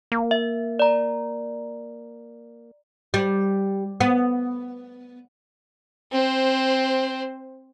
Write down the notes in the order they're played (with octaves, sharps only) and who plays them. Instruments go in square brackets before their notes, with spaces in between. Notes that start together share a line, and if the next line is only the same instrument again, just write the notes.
[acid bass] A#3
[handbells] E5
D5 A#5
[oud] G3
B3
[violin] C4 C5